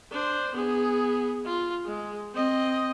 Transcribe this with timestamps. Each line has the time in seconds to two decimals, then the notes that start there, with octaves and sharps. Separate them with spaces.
0.12 D4 C5
0.54 B3 G#4
1.45 F4
1.85 G#3
2.34 C4 D#5